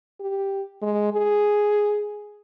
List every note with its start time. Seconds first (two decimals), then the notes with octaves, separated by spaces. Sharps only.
0.20 G4
0.82 G#3
1.13 G#4